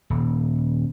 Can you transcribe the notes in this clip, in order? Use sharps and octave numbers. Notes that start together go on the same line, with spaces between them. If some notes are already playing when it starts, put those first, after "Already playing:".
D#1